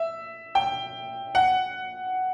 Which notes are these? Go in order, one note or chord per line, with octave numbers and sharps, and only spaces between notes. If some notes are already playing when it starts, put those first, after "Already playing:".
Already playing: E5
G5
F#5